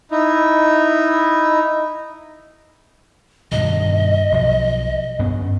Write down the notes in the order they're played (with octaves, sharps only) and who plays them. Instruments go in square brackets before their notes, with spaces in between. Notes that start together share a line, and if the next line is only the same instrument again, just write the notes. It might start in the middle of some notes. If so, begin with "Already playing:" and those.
[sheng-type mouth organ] D#4 E4
[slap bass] G2 B2 D#3 [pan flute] D#5
[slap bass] B1 F3
G2 B3 C#4